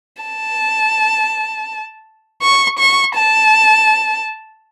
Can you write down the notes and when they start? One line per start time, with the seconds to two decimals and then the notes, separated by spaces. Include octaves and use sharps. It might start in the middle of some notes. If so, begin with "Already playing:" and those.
0.23 A5
2.42 C#6
2.79 C#6
3.16 A5